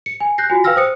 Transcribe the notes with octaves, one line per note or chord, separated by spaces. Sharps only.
C#7
G#5
F#6 G6 A#6 C7
F4 F#4 G#5
B4 F5 G5 E6 F6 A#6
C5 D#6 C#7